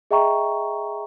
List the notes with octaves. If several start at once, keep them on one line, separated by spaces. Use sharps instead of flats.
G#4 D#5 E5 G5 A#5 C#6